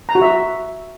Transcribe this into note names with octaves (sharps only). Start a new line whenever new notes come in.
A#5
F#4
E5